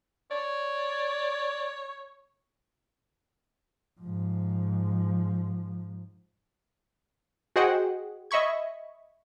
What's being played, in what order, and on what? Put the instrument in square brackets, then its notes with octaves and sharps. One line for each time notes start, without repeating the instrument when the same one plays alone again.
[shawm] C#5 [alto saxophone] D5
[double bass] G#2 F3
[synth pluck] F#4 G#4 C5 D#5 F#5 G5
D#5 E5 B5 C#6 G#6